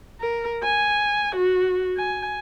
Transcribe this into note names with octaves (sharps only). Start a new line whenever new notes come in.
A#4
G#5
F#4
G#5